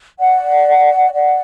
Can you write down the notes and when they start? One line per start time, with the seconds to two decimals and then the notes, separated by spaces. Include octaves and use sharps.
0.19 D5 F#5
1.12 D5 F#5